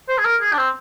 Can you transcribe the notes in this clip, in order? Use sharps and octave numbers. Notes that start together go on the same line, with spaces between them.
C5
G#4
A#4
G#4
D4
C4